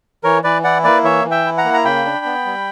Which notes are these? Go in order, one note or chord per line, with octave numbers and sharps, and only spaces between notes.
E3 A#4 C#5
E3 B4 D5
E4 D5 F#5
A#3 B4 D5
E3 C#5 E5
E3
E5 G5
E4
F#5 A#5
A#3
A#5
C#3 G5 B5
D4
B3
G3